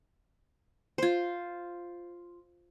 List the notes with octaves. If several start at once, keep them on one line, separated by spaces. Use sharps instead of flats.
F4 C5